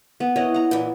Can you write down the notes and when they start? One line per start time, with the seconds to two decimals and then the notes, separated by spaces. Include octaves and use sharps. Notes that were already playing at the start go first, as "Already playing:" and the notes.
0.20 B3
0.36 E3 C#5 D#5 F#5
0.54 F#5 A#5
0.71 A#2 E3